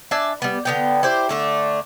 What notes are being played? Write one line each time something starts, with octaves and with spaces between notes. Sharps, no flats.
D4 E5 G#5 A5
G3 B3
D3 B3 G5
E4 G4 C5
D3 A3 D4